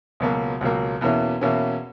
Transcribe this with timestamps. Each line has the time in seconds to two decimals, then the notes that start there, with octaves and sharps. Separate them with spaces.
0.20 C#2 B2 F#3 A#3
0.61 C#2 B2 F#3 A#3
1.01 E2 B2 A#3 C#4 E4
1.41 E2 B2 A#3 C#4 E4